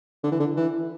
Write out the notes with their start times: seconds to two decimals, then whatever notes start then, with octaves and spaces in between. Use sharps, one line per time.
0.24 D3
0.32 E3
0.40 D3
0.57 E3